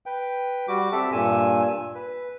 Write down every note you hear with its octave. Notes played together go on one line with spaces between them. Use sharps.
B4 G5
G3 F#4 D6
C4 G4 A4 E5 A5
G2 A#2 G#5 E6
B4